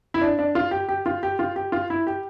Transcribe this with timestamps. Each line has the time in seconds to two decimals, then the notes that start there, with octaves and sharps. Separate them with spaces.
0.14 E4
0.21 D4
0.39 D4
0.55 F4
0.71 G4
0.89 G4
1.06 F4
1.23 G4
1.39 F4
1.56 G4
1.72 F4
1.90 E4
2.07 G4